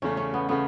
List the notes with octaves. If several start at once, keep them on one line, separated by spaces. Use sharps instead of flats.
E2 C#3 A3 C#4
C#4
B3
C#3 A3 B3